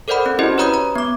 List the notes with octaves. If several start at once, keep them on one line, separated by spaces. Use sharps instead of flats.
A4 A#4 C5 D5 F#5 B5
C4
C#4 E4 F#4 G4 C5 D#5
B4 C#5 A#5 B5 D#6 G6
A#5
B3 D6